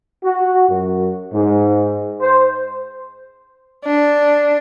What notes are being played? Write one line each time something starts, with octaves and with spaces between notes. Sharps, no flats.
F#4
F#2
G#2
C5
D4